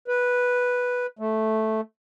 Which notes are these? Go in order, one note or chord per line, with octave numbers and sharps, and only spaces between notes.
B4
A3